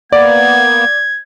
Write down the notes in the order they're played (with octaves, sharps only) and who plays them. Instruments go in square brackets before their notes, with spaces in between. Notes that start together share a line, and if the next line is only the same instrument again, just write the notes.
[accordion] A#3 B3 [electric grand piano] D5 [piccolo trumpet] G#6